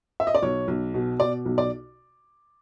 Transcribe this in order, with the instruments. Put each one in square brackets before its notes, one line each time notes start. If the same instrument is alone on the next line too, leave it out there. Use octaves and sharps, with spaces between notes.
[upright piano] E5
D#5
D5
B1 C#5
B1
B2
B2 D5
B1
D5